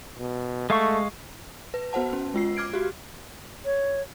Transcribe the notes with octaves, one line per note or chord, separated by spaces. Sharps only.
B2
G#3 A3 F5 C#6
B4
B3 F#4 C5 F#5 A5
C#4
G#3 F4 C7
D6 F6 G#6 D7
F#4 G4
C#5